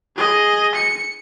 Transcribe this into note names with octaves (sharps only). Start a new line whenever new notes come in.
G#4 D#5
C#7